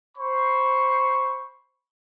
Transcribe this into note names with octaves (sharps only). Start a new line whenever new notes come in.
C5 B5 C#6